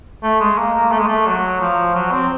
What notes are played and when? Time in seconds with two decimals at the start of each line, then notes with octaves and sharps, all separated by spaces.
0.23 A3
0.40 G#3
0.58 A#3
0.75 A#3
0.92 A3
0.99 G#3
1.08 A3
1.26 F#3
1.60 F3
1.95 F#3
2.12 C4